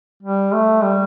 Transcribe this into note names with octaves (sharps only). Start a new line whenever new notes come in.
G3
A3
G3